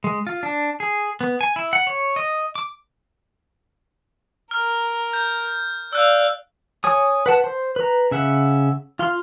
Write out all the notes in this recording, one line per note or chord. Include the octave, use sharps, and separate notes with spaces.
G#3
F4
D4
G#4
B3
G#5
E4
F#5
C#5
D#5
D6
A#4 F6
G6
D5 F5 E6 F#6
C#5 G#5 D#6
B4 F#5 A5
C5
B4 A#5
C#3 E5 F#5
F4 F5 C6